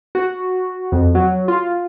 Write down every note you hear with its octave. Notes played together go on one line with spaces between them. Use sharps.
F#4
F2
F#3
F4